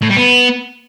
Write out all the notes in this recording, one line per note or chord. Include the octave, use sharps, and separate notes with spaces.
A2
G3
B3